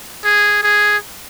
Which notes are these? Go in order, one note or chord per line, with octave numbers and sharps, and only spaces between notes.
G#4
G#4